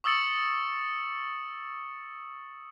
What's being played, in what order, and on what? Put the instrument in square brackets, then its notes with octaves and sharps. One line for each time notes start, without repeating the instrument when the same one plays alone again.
[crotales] C#6 D#6 E6 A6 C#7 F#7